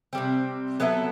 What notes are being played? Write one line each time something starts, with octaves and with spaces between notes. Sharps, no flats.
C3 G3 C4
F#3 B3 E4 A4